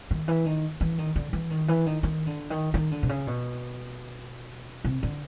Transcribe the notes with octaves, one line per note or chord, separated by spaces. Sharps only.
D#3
E3
D#3
E3
D#3
D3
E3
D#3
E3
D#3
D#3
D3
D#3
D#3
D3
C3
C#3
B2
C3
D3